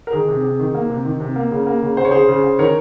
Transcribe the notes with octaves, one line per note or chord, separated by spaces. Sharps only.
A#4
D#3 G#4
C3
C3
D#3
A#3
C3
D#3
C3
A#3
C#3
A#3
C#3
C#3 C5
C#5
C#3 G#4 C5
C#3
C#3
D#3 A#4 C#5